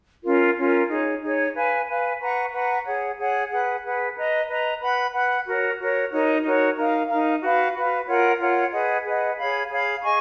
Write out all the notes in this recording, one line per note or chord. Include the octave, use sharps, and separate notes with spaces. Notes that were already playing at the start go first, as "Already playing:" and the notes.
C#4 F4 A#4
C#4 F4 A#4
D#4 G#4 C#5
D#4 G#4 C#5
B4 F5 G#5
B4 F5 G#5
B4 F#5 A#5 C#6
B4 F#5 A#5 C#6
G#4 C#5 F#5
G#4 C#5 F#5
G#4 B4 F#5
G#4 B4 F#5
B4 D#5 A#5
B4 D#5 A#5
B4 F#5 B5
B4 F#5 B5
F#4 A#4 C#5
F#4 A#4 C#5
D#4 F#4 A#4 C#5
D#4 F#4 A#4 C#5
D#4 A#4 F5
D#4 A#4 F5
F#4 B4 F5
F#4 B4 F5
F4 A#4 C#5 F#5
F4 A#4 C#5 F#5
G#4 B4 D#5 F#5
G#4 B4 D#5 F#5
G#4 C#5 F5 B5
G#4 C#5 F5 B5
G#4 D#5 G#5 C#6